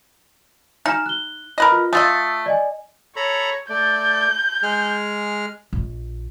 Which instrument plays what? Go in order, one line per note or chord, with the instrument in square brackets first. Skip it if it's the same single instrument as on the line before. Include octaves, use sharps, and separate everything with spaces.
[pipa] D#4 [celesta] G#5 F6 E7
[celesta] F#6 G7
[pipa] A#4 B4 D#5
[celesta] F4
[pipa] A3 F4 D#5 [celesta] D#6 E6 A6
[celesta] D5 D#5 G#5
[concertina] A4 A#5 B5 [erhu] C#5
[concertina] A3 D5 [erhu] G6
[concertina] G#3 G#4 F6
[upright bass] A#1